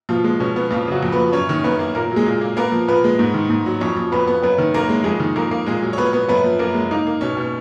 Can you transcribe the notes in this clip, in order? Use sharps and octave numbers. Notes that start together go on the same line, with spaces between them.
B2 F3 F4
G#3
B2 C#4
B3
F2 F3 F4
C#3 F#3 F#4
F2
B3 B4
F3
F#2 C#4 C#5
D#3
F#2 B3 B4
A#3
A#2 A#3 A#4
F#3
G#3 G#4
A#2
A#3
A#3 B3 A#4
F3
A#2 B3 B4
G#3
G#2
D#3
G#2
F#3
F2 C#4 C#5
F3
F2 B3 B4
B3
F#2 B3 B4
D#3
F#2 A#3 A#4
G#3
F2 G#3 G#4
D#3
F2 A#3 A#4
A#3
A#2 G#3 G#4
F#3
C#5
A#2 B3 B4
B3
F#2 B3 B4
F3
F#2 A#3 A#4
G#3
A#3 D#4
A#3
B2 C#4
B2